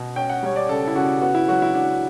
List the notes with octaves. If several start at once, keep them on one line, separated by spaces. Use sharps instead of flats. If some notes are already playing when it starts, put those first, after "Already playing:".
Already playing: B2
C#4 G5
F#5
G3 C#5
D5
C#3 A4
E4
C#3 F#4
B3 F#4
E4
F#3 F#4
E4
D4 F#4